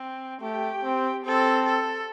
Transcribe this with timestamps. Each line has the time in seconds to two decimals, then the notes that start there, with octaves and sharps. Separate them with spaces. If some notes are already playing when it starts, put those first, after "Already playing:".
Already playing: C4
0.41 A3 G4
0.83 C4
1.25 C4 A4
1.65 A4